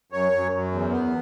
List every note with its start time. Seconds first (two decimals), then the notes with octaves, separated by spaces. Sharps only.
0.12 F#2 C#5
0.32 F#2
0.52 F#2
0.71 E2
0.90 B3